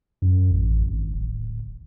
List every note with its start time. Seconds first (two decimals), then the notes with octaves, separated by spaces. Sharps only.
0.22 F#2
0.51 A1
0.88 G#1
1.14 D1